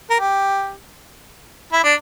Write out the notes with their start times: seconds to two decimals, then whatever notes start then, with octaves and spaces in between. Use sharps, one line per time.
0.10 A#4
0.20 G4
1.73 E4
1.83 D4